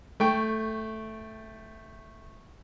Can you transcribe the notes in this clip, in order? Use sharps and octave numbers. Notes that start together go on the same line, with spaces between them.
A3 G5 C#6